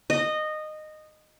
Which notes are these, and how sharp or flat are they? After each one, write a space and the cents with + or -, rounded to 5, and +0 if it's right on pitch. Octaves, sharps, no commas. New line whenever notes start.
D#5 -15